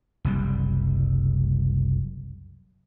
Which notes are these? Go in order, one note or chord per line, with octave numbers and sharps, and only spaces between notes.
F#1 C2 G3